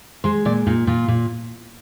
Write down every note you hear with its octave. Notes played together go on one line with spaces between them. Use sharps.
G#3 C5
A#2 D5
A#2 D#4
A#2 F4
A#2